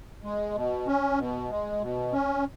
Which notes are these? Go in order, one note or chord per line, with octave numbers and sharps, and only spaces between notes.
G#3
B2
C#4
B2
G#3
B2
C#4